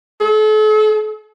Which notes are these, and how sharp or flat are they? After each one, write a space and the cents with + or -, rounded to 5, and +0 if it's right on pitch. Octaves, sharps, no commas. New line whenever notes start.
A4 -40